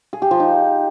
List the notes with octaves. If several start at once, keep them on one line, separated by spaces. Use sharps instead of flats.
G#4
G4
F3
D#4